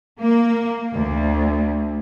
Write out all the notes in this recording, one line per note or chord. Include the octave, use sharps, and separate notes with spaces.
A#3
D2